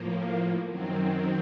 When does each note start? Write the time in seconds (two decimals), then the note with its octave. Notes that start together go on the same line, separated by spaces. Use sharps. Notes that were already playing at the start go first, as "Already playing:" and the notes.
Already playing: A2 F3 A#3
0.66 F#2 D#3 F#3 C4